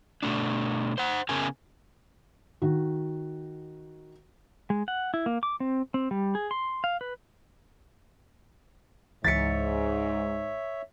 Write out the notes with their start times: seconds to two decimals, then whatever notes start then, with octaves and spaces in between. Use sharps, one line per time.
0.23 B2 A3 D4
0.98 C5 F#5
1.29 C#3 B3 C#4 G#4 A#4 G#5
2.62 D#3 F#4
4.70 G#3
4.88 F#5
5.14 E4
5.26 A#3
5.43 D6
5.60 C4
5.94 C4
6.11 G3
6.35 G#4
6.51 C6
6.84 F5
7.01 B4
9.24 C#2 G#2 E3 C#5 E5 A6 B6 C#7